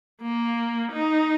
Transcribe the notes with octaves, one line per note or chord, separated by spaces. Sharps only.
A#3
D#4